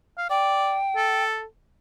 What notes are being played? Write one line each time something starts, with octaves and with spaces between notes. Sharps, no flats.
F5
D5 G5
A4